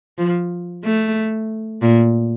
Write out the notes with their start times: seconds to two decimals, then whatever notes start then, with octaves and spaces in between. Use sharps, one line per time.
0.18 F3
0.85 A3
1.82 A#2